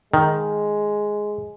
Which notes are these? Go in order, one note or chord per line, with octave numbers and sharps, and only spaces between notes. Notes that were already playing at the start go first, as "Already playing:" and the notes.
D#3 G#3